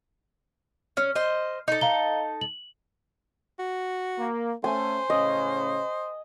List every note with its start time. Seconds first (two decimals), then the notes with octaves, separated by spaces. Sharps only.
0.97 C#4 F6
1.15 C5 D#5
1.68 D#4 A4
1.81 F5 A#5 G7
2.41 F#7
3.59 F#4
4.19 A#3
4.64 A3 C#4 C5 G#5
5.10 A2 C#3 C#4 D#5